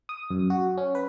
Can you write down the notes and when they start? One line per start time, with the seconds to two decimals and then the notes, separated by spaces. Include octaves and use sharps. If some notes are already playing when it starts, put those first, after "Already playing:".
0.09 D#6
0.31 F#2
0.50 F#4
0.78 C#4
0.95 B4